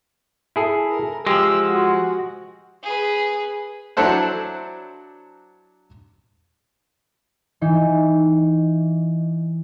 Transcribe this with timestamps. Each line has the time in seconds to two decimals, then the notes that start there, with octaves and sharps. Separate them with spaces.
0.56 E4 G#4 A4
0.90 A#4
1.27 F3 G#3 G4 E6
1.67 F#4
2.83 G#4 B4
3.97 F#3 D4 E4 A4 C5 F#5
7.61 E3 D#4